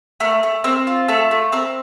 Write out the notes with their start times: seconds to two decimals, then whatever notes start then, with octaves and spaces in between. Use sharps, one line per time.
0.20 A3 A#4
0.43 A3
0.64 C4 A#4
0.87 F4
1.08 A3 A4
1.31 A3
1.52 C4 A#4